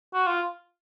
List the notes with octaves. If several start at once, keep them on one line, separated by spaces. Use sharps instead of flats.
F#4
F4